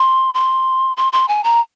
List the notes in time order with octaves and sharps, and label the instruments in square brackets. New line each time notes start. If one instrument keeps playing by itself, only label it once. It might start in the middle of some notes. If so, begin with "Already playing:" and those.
Already playing: [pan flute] C6
C6
C6
C6
G#5
A#5